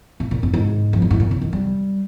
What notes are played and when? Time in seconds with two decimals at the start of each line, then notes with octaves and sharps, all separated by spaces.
0.20 A#2
0.31 A#2
0.43 G2
0.54 G#2
0.93 F2
1.02 G2
1.11 G#2
1.20 A#2
1.31 C#3
1.41 D#3
1.53 G3